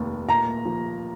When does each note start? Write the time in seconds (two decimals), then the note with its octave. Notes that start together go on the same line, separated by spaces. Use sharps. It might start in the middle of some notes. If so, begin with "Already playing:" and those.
Already playing: F1 D#2
0.28 A#2 A#5
0.65 F3